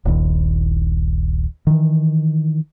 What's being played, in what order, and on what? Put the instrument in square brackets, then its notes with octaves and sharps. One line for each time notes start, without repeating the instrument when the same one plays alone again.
[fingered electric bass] D#1 A#1 D#2
D#3 E3